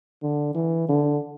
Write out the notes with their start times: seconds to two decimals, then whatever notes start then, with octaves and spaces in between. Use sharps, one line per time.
0.23 D3
0.55 E3
0.89 D3